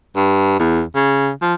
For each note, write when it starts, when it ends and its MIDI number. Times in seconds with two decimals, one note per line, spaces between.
0.16 0.58 43
0.59 0.82 40
0.95 1.30 49
1.42 1.54 53